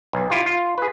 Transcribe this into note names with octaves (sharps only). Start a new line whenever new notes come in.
B1
E4 F4 G4
F4
G#4 B4